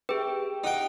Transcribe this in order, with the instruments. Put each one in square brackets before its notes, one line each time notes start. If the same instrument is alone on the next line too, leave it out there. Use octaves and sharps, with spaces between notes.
[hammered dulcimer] G4 G5 [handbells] G#4 B4
[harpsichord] D#4 G5 [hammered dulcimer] G4 F#5